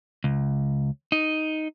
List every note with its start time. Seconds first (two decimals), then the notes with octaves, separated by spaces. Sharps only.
0.24 C#2
1.12 D#4